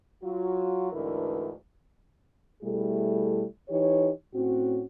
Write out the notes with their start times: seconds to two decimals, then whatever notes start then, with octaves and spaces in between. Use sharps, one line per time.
0.23 F#3 F4 F#4
0.92 D2 G#2 D3 E3 A#4 B4
2.62 B2 G3 A3 E4 G#4 A4
3.69 E3 D#4 G4 C#5
4.34 A2 C4 C#4 F#4